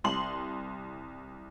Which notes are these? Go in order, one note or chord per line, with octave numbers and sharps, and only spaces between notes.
C2 C6 F#7